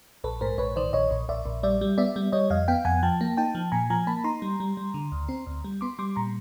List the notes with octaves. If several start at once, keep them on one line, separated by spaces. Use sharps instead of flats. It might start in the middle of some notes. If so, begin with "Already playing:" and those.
A#1 A4 B4
G#2 A#4 C5
A#1 B4 C#5
D#3 C5 D5
A#1 C#5 D#5
A#1
A#1 D5 E5
A#1
G3 D5 E5
G3
B3 D5 E5
G3
G3 C#5 D#5
F2 D#5 F5
B3 F5 G5
F2 F#5 G#5
F3 G5 A5
A#3
D#4 G5 A5
F3
A#2 G#5 A#5
F3 G#5 A#5
A#3 A5 B5
D#4 A#5 C6
G3
G3
G3
D3
D2
C4
D2
G3
B3 C6 D6
G3 C6 D6
A#2 A#5 C6